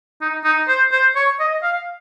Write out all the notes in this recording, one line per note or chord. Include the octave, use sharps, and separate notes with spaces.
D#4
D#4
C5
C5
C#5
D#5
F5